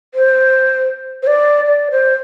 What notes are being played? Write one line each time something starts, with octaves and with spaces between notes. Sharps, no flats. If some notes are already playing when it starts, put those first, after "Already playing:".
C5
C5
D5
D5
C5